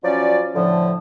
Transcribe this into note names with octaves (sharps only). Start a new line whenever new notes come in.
F3 F#3 C#4 D5
A2 D3 F3